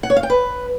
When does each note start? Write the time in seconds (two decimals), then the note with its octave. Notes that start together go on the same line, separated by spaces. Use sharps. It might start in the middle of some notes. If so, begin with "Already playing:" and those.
0.03 F#5
0.10 C#5
0.16 F5
0.23 G5
0.30 B4